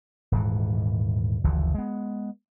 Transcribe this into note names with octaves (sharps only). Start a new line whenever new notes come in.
D#1 G#2 E3
F#1 D2 E3 F3
G#3 B3